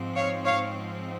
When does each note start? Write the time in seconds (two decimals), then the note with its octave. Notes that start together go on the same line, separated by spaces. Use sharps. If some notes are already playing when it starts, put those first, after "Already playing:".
Already playing: G#2 F3 C4
0.16 C#5 F5
0.45 C#5 F5